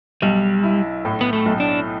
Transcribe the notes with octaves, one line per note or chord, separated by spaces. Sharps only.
B1 G3
E4
A2
B3
A3
B1
D4